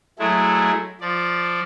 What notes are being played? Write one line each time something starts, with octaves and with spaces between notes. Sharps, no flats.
F#3 G#3 A3 E4
F3 D5